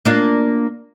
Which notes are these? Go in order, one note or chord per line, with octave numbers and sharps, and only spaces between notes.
A#3 D4 F4